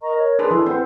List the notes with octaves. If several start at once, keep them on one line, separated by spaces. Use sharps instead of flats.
A#4 D#5 A#5 C#6
C#5
D4 G#4 B4 A5 B5 C6
E3 A4
C4 B4 F#5